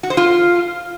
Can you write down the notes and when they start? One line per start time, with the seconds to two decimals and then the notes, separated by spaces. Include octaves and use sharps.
0.03 F#4
0.10 C5
0.17 F4